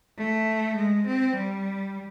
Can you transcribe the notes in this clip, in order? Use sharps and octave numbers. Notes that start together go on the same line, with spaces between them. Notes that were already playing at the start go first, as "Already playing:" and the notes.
A3
G#3
C4
G3